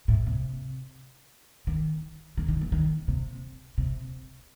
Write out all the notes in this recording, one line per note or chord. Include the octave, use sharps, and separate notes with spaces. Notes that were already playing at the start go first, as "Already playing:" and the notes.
A2
C3
D#3
D#3
D#3
E3
D#3
C3
C3